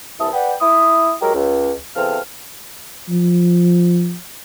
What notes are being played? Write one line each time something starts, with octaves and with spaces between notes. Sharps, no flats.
C2 G2 E3 E5 A5 D#6
B4 D5 F#5 G5
E4 D#6
F#3 G#3 G4 A#4
C#2
E2 C3 C4 A4 F5 F6
F3